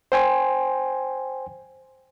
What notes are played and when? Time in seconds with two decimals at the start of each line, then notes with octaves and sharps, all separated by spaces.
0.12 C5 G5 G#5 C6